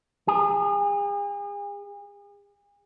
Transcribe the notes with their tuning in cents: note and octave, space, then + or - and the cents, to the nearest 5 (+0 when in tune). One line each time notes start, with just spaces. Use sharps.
G#4 -40